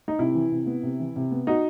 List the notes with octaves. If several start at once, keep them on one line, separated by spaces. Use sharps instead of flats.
D#4
C3 E4
E3
C3
B3
C3
E3
C3
B3
D#4 F#4